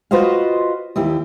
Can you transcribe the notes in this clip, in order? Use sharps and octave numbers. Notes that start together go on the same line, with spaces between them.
F4 F#4 B4 C5 D#5 F5
D#2 E3 E4 G4